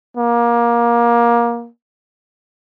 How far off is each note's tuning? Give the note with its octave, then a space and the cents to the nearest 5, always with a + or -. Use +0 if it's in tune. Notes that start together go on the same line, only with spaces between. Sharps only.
A#3 +20